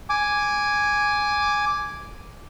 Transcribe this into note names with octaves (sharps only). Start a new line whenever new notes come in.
G#5 D6